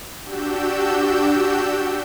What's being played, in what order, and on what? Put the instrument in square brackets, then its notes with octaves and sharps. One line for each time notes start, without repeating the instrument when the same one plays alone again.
[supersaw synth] D4 F#4 G4 E6 G6